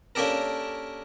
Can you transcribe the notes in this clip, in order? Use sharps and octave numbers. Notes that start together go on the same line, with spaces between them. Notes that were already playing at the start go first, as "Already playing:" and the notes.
A#3 C#4 D4 G4 A4 A#4